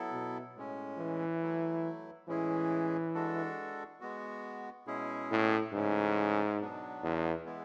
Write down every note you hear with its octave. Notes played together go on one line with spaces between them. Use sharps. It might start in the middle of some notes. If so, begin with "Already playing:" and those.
Already playing: F#3 B3 E4 A4
B2
A2 G#3 C#4
E3
F#3 A3 E4
A2 E3 G#3 C#4 E4 G#4
G#3 D4 F#4 A4
G#3 B3 F#4
B2 G#3 C#4 E4 G#4
A2
G#2 C#3 E3 A3 C#4
B2 F#3 B3 D4
E2
E3 G#3 B3 E4